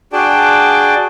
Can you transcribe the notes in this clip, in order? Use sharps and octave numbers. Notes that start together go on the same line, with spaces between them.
D4 F#4 G#4 D5 G5 A5